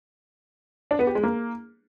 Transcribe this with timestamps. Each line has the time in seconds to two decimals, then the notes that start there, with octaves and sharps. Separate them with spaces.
0.91 D4
0.99 B3
1.07 G4
1.15 G#3
1.23 A#3